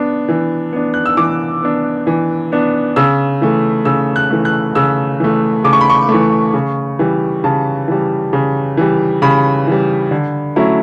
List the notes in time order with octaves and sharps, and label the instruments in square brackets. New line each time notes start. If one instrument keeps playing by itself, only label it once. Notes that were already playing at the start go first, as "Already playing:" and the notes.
Already playing: [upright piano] B3 D4
E3
B3 D4
F#6
E6
E3 D6
B3 D4
E3
B3 D4
C#3 E6
E3 A3
C#3 E6
F#6
E3 A3
F#6
C#3 E6
E3 A3
C#3 D6
C#6
B5
C#6
A3
E3
C#3
E3 G3
C#3 A5
E3 G3
C#3
E3 G3
C#3 B5
E3 G3
D3
F#3 A3 C#4 E4